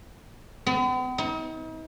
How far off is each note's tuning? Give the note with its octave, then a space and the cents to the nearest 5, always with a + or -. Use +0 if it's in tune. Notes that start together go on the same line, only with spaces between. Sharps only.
B3 +45
D#4 +40